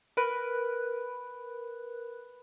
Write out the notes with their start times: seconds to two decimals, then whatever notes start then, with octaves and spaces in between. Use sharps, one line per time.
0.17 A#4 B4 B5 F#6